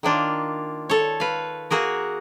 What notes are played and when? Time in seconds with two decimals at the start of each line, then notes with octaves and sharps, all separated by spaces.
0.03 D#3 A#3 D4 F4
0.89 A4 C#5
1.20 B4 F5
1.71 A#3 F#4 G#4 A#4